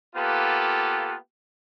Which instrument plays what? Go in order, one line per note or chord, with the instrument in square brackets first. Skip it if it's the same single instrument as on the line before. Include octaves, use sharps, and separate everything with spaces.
[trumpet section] A#3 B3 F4 G4 A4 B4